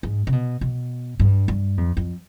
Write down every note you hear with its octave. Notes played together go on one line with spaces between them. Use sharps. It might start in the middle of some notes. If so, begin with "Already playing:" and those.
G#2
C3
B2
B2
G2
G2
F2
F2